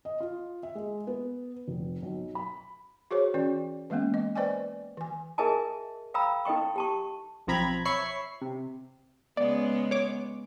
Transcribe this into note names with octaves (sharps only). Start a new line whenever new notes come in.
D#5
F4
E5
G#3
B3
F1
B1
B5
F#4 G#4 C5 C#5
E3 C#4 F#4 D5
E3 G#3 A#3 B3 C#4
D#5
B4 C5 D5 D#5 G5 G#5
E3 G#5
G#4 A#4 D#5 E5 G#5 A5
F5 G5 A#5 B5 E6
D#4 A4 D#5 G5 C#6
G4 A5 C#6
B1 F3 C4 A#5 B5 G#6
C#5 E5 B5 C#6 C7
C3
C#3 G#3 B3 D5
C#5 D6